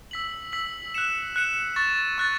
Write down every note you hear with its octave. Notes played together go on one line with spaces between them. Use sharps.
E6 B6 F#7
E6 B6 F#7
F#6 C#7 E7
F#6 C#7 E7
C#6 F#6 A6
C#6 F#6 A6